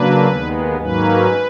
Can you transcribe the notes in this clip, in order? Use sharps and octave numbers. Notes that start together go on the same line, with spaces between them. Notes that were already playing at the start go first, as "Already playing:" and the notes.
Already playing: C#3 F#3 A#3 D4 B4
D#2 D#3 G#3 B3
G#2 D#3 F#3 A#3 C#4 B4